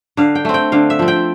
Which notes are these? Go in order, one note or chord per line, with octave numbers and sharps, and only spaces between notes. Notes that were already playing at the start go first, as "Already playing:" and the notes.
D3 F5
G5
A3 C4
G5
D3 F5
E5
F3 C4
G5